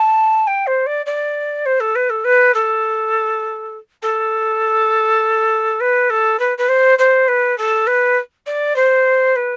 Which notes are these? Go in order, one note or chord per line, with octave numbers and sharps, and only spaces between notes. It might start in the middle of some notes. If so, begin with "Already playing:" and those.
Already playing: A5
G5
C5
D5
D5
C5
A4
B4
A4
B4
A4
A4
B4
A4
B4
B4
C5
C5
B4
A4
B4
D5
C5
B4